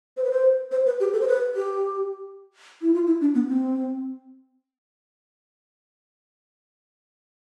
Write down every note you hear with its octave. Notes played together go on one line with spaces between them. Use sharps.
C5
B4
C5
C5
B4
G4
A4
C5
B4
G4
E4
F4
E4
D4
B3
C4